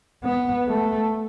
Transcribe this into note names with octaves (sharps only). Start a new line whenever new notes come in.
B3
A3